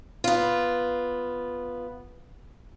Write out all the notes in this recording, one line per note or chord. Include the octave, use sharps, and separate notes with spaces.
B3 F4